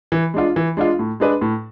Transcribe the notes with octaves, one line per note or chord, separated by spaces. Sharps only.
E3
G#3 D4 F4
E3
G#3 D4 F4
A2
G#3 D4 G#4 B4
A2